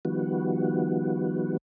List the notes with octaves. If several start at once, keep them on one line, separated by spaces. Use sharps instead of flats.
D#3 F3 G3 B3 F#4